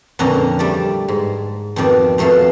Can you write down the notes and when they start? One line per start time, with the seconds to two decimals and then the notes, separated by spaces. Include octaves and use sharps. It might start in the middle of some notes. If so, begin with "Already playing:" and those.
0.19 F2 A#2 D3 C#4 A#4 A#5
0.59 G3 A3 A4 D5
1.08 G#2
1.76 F2 B2 D#3 D5
2.18 F2 B2 A3 A4 F5 B5